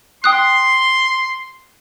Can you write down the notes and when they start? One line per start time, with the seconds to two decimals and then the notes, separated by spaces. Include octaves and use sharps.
0.24 G5 C6 D#6 F#6